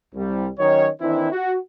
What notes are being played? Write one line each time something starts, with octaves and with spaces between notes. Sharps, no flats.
C2 G3
D#3 F#3 C#4 D#4 C#5
D#3 E3 C4 D4 E4
F#4